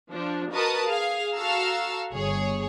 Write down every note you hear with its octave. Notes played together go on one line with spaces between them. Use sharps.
F3 D4
F#4 A#4 B4 D#5 A5 D#6
G#4 F5
F#4 A4 F5 A#5 E6 F6
G1 G#4 C#5